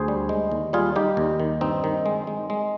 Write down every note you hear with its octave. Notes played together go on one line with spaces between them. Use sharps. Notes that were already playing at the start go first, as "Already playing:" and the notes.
Already playing: D2 G#4 C5
G3
G#3
D#2
G3 F4 G#4
G3 D#4 G4
D#2
D#3
G2 C4 D#4
D#3
G#3
G#3
G#3